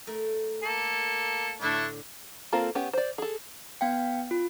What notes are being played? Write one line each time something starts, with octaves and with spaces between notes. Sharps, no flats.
A3 A#4
A#3 A4
A2 D3 A3 D4 E4 C6
A#3 C4 F4 A4
B3 C#4 G4
C5 D5
G#4 A4
B3 F5 G5
F4